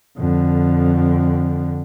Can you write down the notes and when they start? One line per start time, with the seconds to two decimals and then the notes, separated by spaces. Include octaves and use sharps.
0.18 F2 D3